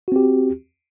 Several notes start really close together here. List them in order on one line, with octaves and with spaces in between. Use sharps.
F#4 C4 G4